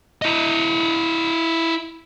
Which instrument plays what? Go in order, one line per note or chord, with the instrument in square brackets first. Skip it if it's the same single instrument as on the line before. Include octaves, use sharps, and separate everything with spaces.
[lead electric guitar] E4 D#5